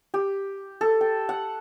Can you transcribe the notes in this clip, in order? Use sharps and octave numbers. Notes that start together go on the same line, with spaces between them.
G4
A4
G5
F#5